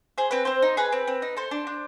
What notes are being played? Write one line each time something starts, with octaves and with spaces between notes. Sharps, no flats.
G#4 C5
C4 B4
C4 C5
D#4
G#4 B4
C4
C4
D#4
A4 C5
D4
D4